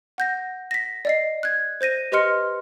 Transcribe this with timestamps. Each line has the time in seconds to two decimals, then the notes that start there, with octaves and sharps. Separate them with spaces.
0.18 F#5 G6 A#6
0.71 A#6 B6
1.05 D5 D#5 C7
1.43 F#6 G#6
1.81 C5 G6 A#6 D#7
2.12 G4 B4 D#5 C6 F6 C#7